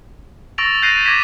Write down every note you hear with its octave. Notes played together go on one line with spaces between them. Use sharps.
C#6 E6 A6 A#6 D7 F7
F#6 G6 A6 A#6 C7 D#7
D6 G#6 A#6 B6 E7